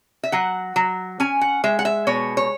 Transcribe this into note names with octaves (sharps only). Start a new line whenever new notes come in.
E5
F#3 F#5
F#3
C#4 G#5
F#5
G#3 E5
F#5
E5
B2 C#5
C#5